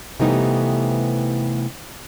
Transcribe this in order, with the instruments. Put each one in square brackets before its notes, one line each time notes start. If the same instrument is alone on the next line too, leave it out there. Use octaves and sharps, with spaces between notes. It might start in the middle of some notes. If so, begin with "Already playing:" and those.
[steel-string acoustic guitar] C3 E3 G3 A3 B3 D#4